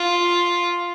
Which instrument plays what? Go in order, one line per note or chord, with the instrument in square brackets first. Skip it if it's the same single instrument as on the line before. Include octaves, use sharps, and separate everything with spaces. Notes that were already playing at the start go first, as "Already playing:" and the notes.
Already playing: [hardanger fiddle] F4